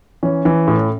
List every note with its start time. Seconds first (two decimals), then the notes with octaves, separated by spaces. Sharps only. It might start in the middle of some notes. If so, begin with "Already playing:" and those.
0.23 E3 C#4
0.45 E3
0.68 A2